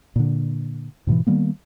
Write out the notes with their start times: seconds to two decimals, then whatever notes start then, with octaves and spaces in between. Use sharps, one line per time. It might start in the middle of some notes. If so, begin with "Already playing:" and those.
0.16 A#2 D3
1.07 G#2 B2 D3 E3
1.27 D#3 G3 A#3 B3